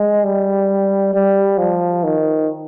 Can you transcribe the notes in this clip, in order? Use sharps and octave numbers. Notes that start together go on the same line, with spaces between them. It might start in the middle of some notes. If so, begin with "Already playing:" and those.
Already playing: G#3
G3
G3
F3
D#3